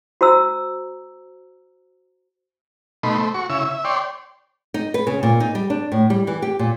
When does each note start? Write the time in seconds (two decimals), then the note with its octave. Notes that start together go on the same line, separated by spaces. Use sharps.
0.21 F#4 C5 A#5 E6
3.03 B2 A3 D#4 B5 C6
3.18 A3 C5
3.34 F#4 C#6
3.50 C#3 E4 C#5 E6
3.65 E5
3.85 C#5 D5 G5 C6
4.74 D#4
4.94 B4
5.07 C#3
5.23 A#2
5.40 D#4
5.55 G3
5.70 D4
5.92 A2
6.10 G3
6.27 E3
6.42 G4
6.59 A#2